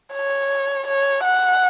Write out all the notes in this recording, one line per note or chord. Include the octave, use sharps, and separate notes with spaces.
C#5
C#5
F#5